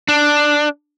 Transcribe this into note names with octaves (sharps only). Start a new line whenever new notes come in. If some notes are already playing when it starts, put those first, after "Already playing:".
D4